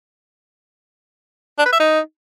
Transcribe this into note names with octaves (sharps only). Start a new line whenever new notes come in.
D4
B4
E5
D#4